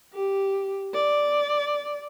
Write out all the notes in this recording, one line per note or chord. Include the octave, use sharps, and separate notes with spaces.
G4
D5